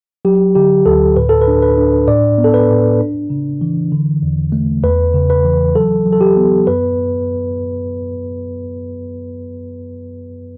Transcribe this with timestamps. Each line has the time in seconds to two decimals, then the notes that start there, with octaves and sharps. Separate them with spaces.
0.25 F#3 G4
0.55 D3 G4
0.86 D2 A4
1.16 A2 B4
1.29 A4
1.41 B4
1.48 D4
1.62 B4
1.78 D4
2.08 A2 D5
2.38 B3
2.44 A4
2.54 B4
2.69 A2
3.00 D4
3.30 C#3
3.61 E3
3.92 D3
4.23 E2
4.52 A3
4.83 E2 B4
5.14 C#3
5.30 B4
5.45 E3
5.75 F#3 A4
6.06 F#3
6.12 A4
6.21 G4
6.37 B3
6.67 F#2 B4